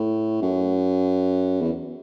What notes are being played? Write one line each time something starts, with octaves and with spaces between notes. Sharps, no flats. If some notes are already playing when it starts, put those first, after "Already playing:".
Already playing: A2
F#2
E2